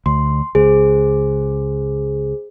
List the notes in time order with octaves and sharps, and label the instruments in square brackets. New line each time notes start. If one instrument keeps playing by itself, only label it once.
[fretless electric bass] D2 [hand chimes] C6
[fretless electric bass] C#2 [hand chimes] G#4 C5